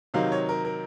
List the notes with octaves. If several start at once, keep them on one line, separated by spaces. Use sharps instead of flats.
C3 D#3 F#3 C4 D#4 F5
C#5
A#4
A#4